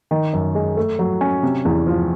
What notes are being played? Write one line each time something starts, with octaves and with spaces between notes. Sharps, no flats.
D#3
F#2
G#3
A3
F#3
C#4
C3
E2
F3